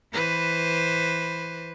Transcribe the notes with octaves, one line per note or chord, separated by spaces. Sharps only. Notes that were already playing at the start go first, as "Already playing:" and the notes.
E3 B4 C5